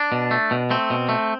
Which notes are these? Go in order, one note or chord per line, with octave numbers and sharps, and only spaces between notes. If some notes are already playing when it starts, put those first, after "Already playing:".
Already playing: D4
B2
A3
B2
A3 C4
B2
A3